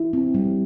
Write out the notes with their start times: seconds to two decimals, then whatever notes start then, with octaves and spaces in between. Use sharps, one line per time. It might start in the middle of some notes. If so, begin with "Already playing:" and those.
Already playing: E4
0.13 C4
0.35 G3